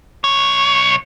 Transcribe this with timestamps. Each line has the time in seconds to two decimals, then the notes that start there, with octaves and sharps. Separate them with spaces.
0.24 B1 C#5